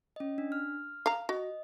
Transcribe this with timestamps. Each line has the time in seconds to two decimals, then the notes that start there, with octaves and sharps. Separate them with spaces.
0.16 C#4 D#5
0.38 D4
0.52 F6
1.06 F5 A#5
1.29 F#4 D#5